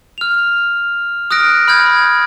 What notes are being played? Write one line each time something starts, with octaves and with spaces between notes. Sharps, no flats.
F6 F7
D#6 F6 F#6 A#6 D7
B5 F6 G6 G#6